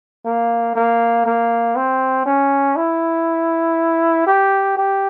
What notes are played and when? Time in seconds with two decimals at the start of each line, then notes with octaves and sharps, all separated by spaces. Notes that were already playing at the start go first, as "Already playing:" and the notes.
0.25 A#3
0.75 A#3
1.26 A#3
1.76 C4
2.26 C#4
2.76 E4
4.26 G4
4.77 G4